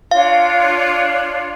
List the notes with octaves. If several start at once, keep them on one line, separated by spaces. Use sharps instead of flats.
D4 F4 C#5 F5